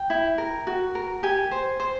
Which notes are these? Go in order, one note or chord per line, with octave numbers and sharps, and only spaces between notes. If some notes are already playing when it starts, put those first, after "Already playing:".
Already playing: G5
E4
A#4
F#4
A#4
G4 G#5
C5
C5